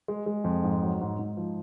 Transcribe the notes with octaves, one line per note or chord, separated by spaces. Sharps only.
G#3
G#3
F2
G#2
F#3
G#2
G#2
F3